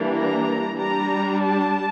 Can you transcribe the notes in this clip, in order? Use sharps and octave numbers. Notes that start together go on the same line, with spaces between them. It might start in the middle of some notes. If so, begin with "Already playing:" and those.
Already playing: E3 G3 A#3 D4
A#5
G3 D4 A#5
A5